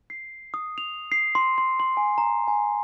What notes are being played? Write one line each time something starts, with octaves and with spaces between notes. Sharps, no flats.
C7
D#6
F7
C7
C6
C6
C6
G#5
A#5
G#5